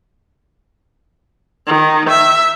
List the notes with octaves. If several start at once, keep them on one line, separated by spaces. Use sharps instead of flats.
D#3
E5